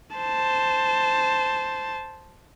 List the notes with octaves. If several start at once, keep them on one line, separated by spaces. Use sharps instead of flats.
C5 A5